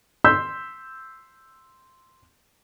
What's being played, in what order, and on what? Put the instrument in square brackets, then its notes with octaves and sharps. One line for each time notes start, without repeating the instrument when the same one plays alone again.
[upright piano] C6 E6 G6 B6